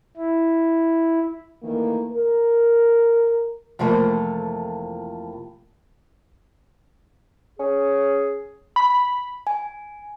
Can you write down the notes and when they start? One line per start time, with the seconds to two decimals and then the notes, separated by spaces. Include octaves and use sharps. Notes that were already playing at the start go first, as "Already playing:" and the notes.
0.17 E4
1.63 D#3 E3 A3 A#3
2.12 A#4
3.79 F2 C3 E3 F3 A3 A#3
7.59 C#4 G#4
8.76 B5
9.47 G#5